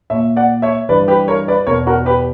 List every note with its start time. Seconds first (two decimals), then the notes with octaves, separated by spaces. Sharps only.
0.10 A#2 C#5 E5
0.36 D5 F#5
0.62 C#5 E5
0.89 G2 E3 B4 D5
1.08 G4 B4
1.28 A#4 C#5
1.48 B4 D5
1.67 E2 B2 A#4 C#5
1.87 F#4 A#4
2.06 G4 B4